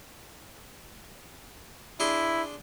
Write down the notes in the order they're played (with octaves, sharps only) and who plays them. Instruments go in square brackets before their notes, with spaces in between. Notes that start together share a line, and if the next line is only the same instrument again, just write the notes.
[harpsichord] D4 G#4 C6 [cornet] E4